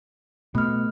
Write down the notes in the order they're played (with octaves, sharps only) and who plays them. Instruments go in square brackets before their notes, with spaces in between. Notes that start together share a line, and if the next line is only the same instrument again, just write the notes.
[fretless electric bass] B2 [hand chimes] A3 F6